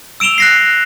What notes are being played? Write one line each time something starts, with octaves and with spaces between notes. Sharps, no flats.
E6 D7 E7 F7 G7
F#6 A#6 C7